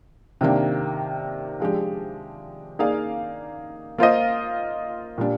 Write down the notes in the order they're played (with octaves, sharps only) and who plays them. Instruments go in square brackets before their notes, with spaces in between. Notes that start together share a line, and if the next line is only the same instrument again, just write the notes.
[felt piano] C3 D#3 A#3 D4
F3 G#3 D4 G4
A#3 D#4 G#4 D5 F5
A#3 F4 C5 D#5
A#2 G3 D4